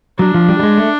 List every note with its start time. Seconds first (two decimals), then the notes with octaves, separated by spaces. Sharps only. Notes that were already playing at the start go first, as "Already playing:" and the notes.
0.19 F#3 D4
0.34 F3
0.49 G3
0.59 G3
0.63 G#3
0.78 A3